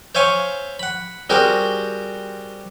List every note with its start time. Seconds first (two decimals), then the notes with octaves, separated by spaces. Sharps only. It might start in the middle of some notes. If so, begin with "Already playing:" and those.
0.15 C5 C#5 E5 F5 G#5 C#6
0.80 F#5 B5
1.30 G3 C4 F#4 G#4 A#4 C5